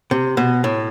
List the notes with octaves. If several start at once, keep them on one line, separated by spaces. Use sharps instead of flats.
C3
B2
A2